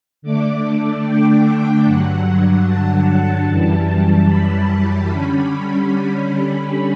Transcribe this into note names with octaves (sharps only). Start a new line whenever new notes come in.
D3 A3 D4 D6
G5
G2 D3 F#3 F#5
A5
A5
F#2 E3 G3 A5
B5
D3 G3 C#4
B5